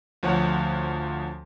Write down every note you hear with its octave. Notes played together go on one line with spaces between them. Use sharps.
D2 F3 C#5 F#5